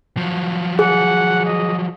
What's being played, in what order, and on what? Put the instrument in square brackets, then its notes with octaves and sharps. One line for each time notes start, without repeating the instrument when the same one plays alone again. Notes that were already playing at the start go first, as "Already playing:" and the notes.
[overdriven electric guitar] F3 F#3
[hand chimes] G#4 [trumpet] F#5
[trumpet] D#5